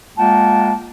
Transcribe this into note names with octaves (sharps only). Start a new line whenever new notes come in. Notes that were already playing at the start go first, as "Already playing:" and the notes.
G#3 A#3 F4 F#5 G5 A5